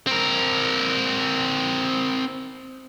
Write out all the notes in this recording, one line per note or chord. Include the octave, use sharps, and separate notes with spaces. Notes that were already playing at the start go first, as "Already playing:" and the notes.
C4 A#4